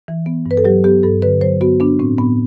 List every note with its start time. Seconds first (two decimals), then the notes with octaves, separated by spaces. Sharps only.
0.08 E3
0.26 B3
0.46 G2
0.51 B4
0.57 A4
0.65 F#3 G4
0.84 B3 G4
1.03 G2 A4
1.22 D3 B4
1.41 F#3 C5
1.61 B3 F#4
1.80 B3 D4
1.99 A2 C4
2.18 A2 B3